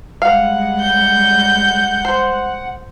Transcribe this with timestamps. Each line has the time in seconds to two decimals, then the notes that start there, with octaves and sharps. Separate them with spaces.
0.22 G3 G#3 F5 F#5
0.80 G6
2.05 C5